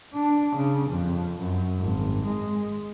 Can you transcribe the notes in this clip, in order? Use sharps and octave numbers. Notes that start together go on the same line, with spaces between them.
D4
C#3
F2
F#2
G#1
G#3